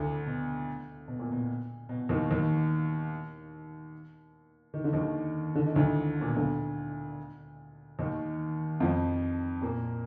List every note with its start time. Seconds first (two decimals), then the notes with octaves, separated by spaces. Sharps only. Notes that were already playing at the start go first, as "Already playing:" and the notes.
Already playing: D2 D3
0.27 B2
1.08 B2
1.19 A#2
1.32 B2
1.89 B2
2.09 D#2 D#3
2.30 D#2 D#3
4.74 D#3
4.84 D3
4.93 D#2 D#3
5.55 D3
5.66 D#3
5.76 D2 D3
6.21 A#2
6.28 B2
6.36 D2 D3
7.99 D#2 D#3
8.80 F2 F3
9.62 A#2 A#3